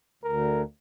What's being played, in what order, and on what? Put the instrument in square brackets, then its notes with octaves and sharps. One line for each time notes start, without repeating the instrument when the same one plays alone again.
[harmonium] D2 [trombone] A#4